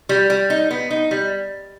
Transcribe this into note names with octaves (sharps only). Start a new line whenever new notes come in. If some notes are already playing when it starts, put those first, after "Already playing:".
G3
G3
D#4
B3
D#4
G3